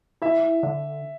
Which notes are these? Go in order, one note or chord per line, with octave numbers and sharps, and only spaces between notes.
E4 E5
D3